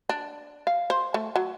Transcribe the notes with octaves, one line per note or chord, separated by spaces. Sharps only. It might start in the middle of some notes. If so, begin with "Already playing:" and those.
D4
F5
C5
A3
F#3